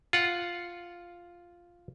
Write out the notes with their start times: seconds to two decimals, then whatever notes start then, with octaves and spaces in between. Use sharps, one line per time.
0.13 F4 F#5